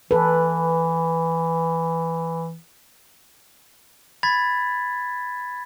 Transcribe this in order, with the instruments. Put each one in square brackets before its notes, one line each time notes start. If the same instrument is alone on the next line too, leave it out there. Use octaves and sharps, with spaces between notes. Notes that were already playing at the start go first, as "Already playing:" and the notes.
[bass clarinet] E3 [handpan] A4 B4
[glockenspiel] B5 G#6 A6 B6